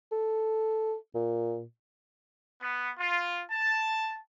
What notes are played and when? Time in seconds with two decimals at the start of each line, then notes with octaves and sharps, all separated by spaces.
0.12 A4
1.15 A#2
2.61 B3
2.99 F4
3.51 A5